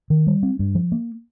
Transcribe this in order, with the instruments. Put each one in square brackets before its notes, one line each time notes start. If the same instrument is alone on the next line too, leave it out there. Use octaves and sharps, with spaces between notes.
[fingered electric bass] D#3
G3
C4
G2
F3
A#3